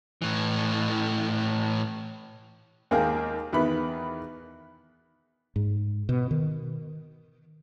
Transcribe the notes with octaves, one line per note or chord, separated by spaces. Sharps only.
A2 E3
D#2 G#3 G#4 A#4 F5 G5
E2 D#3 B3 B5
G#2
B2
D#3